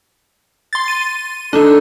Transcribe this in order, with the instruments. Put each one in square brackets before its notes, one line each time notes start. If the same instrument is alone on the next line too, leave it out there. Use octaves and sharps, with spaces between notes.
[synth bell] C6 A6
D#7
[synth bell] D4 D#4 [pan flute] A4